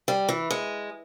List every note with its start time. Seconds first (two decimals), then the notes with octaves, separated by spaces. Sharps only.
0.08 G3
0.29 E3
0.51 G#3